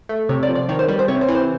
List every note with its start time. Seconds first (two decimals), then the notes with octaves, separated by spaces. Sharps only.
0.09 A3
0.29 C3 C#5
0.43 D5
0.49 F3
0.55 D5
0.69 D#3 C#5
0.79 C5
0.88 G3 B4
0.99 C5
1.08 C3 C#5
1.21 C5
1.28 E3
1.35 C5